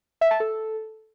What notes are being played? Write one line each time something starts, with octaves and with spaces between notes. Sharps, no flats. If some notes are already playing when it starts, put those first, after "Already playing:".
E5
A5
A4